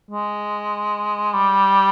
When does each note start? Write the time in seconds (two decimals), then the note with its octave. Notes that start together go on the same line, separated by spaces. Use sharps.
0.11 G#3
1.33 G3